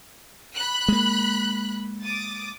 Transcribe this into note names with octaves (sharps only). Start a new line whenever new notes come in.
B5 F#6
G#3 A#3
D6 D#6 A6